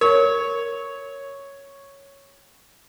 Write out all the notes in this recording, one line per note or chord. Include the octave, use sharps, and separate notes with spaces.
A#4 C#5